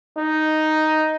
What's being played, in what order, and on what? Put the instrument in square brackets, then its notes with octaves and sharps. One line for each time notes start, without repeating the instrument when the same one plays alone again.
[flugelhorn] D#4